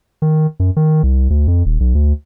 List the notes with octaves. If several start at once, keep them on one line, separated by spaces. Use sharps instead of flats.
D#3
F#2
D#3
C2
D2
F2
D#1
B1
D2